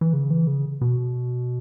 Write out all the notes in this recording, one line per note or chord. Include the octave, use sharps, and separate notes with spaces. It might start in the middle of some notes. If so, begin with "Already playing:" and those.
E3
C#3
E3
C#3
B2